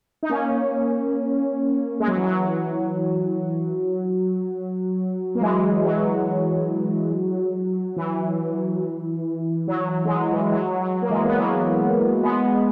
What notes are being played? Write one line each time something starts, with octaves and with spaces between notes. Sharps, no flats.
D#4
A#3 C#4
G#3
F#3
E3
F#3
A#3
E3 G#3
F#3
E3
F#3
F#3
G#3
F#3
E3
F#3
F#3
A#3
E3 G#3
B3
F#3 A#3
G#3 B3